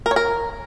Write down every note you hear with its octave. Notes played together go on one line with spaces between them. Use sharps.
A#4
C#5
A#4